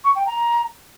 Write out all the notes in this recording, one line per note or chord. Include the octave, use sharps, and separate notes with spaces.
C#6
G5
A#5